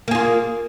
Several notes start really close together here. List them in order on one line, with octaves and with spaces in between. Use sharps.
A#3 G#4 F4